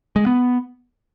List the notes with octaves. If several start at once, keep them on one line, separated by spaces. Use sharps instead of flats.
G#3
B3